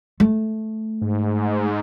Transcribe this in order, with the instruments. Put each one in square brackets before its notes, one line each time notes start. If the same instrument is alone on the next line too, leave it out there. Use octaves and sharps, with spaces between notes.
[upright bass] A3
[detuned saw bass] G#2